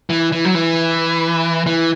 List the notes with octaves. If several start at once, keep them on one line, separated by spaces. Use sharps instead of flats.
E3
E3
F#3
E3
E3